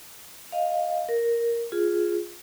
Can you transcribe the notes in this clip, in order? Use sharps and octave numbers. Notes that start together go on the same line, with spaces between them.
D#5 F5
A#4
F4 G#4